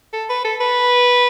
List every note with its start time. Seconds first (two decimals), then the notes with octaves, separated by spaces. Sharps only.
0.13 A4
0.29 B4
0.45 A4
0.61 B4